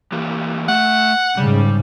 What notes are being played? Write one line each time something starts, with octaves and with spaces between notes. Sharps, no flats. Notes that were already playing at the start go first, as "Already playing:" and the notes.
E3 A#3 G4
A3 F#5
G#2 C#3 G3